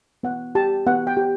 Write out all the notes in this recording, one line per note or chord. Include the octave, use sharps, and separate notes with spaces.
B3 F#5
G4 A5
B3 F#5
G5
G4